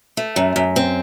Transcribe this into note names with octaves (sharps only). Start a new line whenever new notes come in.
A3
F#2
F#2
C4